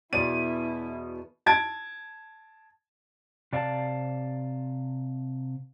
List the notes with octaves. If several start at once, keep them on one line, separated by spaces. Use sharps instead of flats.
E2 B2 B3 E4 D5 D#7
A5 G#6 D7
C3 D5 F5 G#5 A5